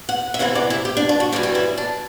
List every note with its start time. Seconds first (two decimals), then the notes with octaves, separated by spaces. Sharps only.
0.09 F#5
0.34 E5
0.39 E2 C3 E3 B3 F#5
0.55 D5
0.70 E4
0.85 G4
0.97 D4
1.09 D4
1.20 F#4
1.32 F#2 E3 G3 B3 G4
1.43 G4
1.55 E4
1.78 D4